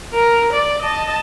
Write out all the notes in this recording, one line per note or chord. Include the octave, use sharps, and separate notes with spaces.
A#4
D5
D#5 A5